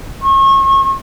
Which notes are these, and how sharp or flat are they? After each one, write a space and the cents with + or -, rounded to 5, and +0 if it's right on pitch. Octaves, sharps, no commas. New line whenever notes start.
C#6 -35